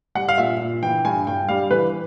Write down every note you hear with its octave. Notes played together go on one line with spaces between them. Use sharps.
G3 F#5
F5
A#2 E5
A#2
E3 G5
G2 G#5
G2 G5
G3 F5
E3 B4